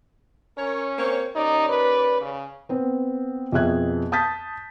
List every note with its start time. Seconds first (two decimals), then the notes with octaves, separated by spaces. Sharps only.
0.57 C#4 A#4 C#5
0.98 A#3 C4 C#5
1.36 D#2 C#4 D#4 D5
1.69 B4
2.21 C#3
2.69 B3 C4
3.52 F2 B2 G#4 E5 F#6 G#6
4.12 A5 D#6 G6 A6 B6